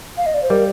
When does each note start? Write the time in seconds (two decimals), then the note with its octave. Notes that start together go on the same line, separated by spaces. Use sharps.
0.17 F5
0.26 D#5
0.34 D5
0.43 C5
0.50 G3 A#4